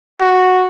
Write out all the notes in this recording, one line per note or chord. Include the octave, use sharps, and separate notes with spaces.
F#4